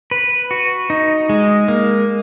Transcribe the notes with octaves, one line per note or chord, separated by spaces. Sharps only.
B4
F#4
D#4
G#3
A#3